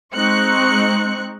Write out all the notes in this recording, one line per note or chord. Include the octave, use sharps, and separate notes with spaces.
G#3 C4 D#4 C#6 F#6 C#7